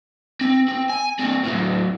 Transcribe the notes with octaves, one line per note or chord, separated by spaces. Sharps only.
C4
C4
G#5
C4 D4
A2 F#3